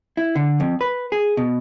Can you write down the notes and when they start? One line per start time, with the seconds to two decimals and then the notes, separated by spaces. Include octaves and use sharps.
0.17 E4
0.35 D3
0.60 F2
0.81 B4
1.12 G#4
1.37 B2